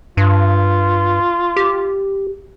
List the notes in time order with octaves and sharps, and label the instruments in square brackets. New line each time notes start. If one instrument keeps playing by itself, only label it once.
[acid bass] G2 [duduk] F4
[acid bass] G4